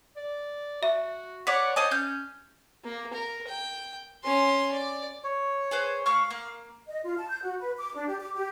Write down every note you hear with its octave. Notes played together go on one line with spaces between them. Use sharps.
D5
F#4 E5
B4 C#5 D5 F#5 B6
C5 C#5 D#5 A5
C#4 G6
A#3
A#4
G5
C#4 C6
D5
C#5
G#4 B4 C5
A3 F5 C#6 F6
A#3
D#5
F4
A5
G6
F#4
B4
D6
D4
G4
D6
G4